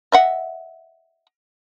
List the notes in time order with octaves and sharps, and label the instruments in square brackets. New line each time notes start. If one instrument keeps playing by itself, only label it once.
[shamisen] D#5 E5 F#5